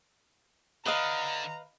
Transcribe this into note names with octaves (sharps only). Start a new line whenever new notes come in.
D3 B4 D#5 F5 A#5